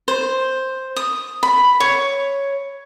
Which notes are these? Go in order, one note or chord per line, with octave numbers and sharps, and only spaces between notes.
C5
D#6
B5
C#5